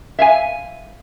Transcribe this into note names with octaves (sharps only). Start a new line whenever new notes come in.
E5 F5 G#5